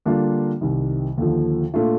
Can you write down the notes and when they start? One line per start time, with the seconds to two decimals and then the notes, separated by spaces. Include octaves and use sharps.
0.06 D3 G3 A#3 D4 F4
0.61 C2 C3 D#3 G3
1.18 D#2 D3 F3
1.74 A#2 A3 D4 F4